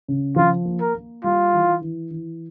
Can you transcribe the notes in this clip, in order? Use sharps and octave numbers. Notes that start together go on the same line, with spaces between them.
C#3
F3 F4
A#3
A#4
A#3
G3 F4
E3
E3
E3